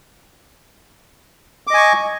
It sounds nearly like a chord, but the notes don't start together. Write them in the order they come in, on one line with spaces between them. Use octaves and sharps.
D6 D#5 G#5 C#6